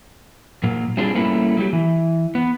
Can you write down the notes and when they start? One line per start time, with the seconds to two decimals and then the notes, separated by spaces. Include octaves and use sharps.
0.63 A#2 F#3 A#3
0.97 F#3 G3 C4 D4 F4 G#4
1.15 G3 A3 A#3 C#4 E4 B4
1.57 F#3 G3 G4
1.73 E3
2.35 B3